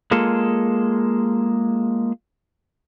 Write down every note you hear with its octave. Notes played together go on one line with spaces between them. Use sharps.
G#3 A#3 F4 G#4 A4